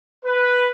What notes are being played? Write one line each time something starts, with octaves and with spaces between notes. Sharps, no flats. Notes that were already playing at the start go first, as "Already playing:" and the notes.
B4